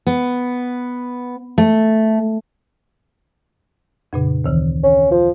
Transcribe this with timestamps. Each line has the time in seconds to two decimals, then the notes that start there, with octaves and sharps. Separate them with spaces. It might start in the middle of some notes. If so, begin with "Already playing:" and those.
0.07 B3
1.58 A3
4.13 F2 A#2 C#3
4.44 D2 D#3 E3
4.83 C#4
5.11 F3